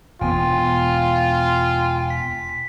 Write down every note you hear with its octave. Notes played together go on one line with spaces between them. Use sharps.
E1 B3 F4 G5 G#5
B6